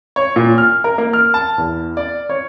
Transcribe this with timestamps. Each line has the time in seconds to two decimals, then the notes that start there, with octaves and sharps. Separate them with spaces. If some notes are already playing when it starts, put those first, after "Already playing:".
0.16 C#5
0.36 A#2
0.58 F6
0.84 A#4
0.98 A#3
1.13 F6
1.34 A5
1.58 E2
1.97 D5
2.29 C#5